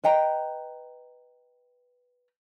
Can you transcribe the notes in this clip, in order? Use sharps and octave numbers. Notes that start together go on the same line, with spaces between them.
B4 D#5 G5 A#5